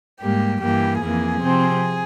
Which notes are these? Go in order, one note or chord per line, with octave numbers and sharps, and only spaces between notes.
G#2 G3 A#3 G4
G2 E3 A#3 G4
F2 E3 A#3 G#4
C3 F3 C4